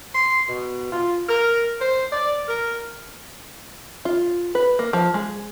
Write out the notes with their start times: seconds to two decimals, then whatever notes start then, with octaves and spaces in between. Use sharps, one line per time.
0.15 C6
0.48 B2
0.92 F4
1.29 A#4
1.80 C5
2.12 D5
2.48 A#4
4.05 F4
4.55 B4
4.79 A#3
4.93 F3
5.14 G#3